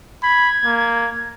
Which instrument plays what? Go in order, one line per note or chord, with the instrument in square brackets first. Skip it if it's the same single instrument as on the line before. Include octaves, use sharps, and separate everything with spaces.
[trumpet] B5 [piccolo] G#6
[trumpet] A#3